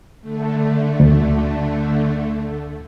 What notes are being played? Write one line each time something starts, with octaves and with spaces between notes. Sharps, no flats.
D3 A3
D2